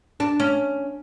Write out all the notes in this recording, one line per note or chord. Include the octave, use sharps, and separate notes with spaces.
D4
C#4